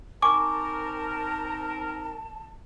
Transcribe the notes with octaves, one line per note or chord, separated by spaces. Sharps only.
C4 D#4 A#4 G#5 A5 C#6 D6